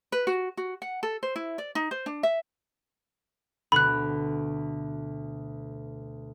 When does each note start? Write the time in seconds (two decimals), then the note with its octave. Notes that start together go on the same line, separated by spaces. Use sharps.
0.12 B4
0.27 F#4
0.57 F#4
0.82 F#5
1.03 A4
1.23 C5
1.36 E4
1.58 D5
1.75 D#4
1.91 C5
2.06 D4
2.23 E5
3.72 D2 B2 B5 F#6